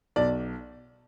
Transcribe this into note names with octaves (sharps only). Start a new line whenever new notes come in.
B1 D5